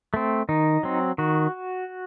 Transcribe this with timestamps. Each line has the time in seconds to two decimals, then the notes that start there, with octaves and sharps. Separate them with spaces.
0.14 A3 C4
0.49 D#3 D#4
0.83 F#3 C4
1.18 D#3 F#4